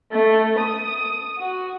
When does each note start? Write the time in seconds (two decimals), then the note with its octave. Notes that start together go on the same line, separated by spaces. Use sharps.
0.12 A3
0.58 D#6
1.39 F#4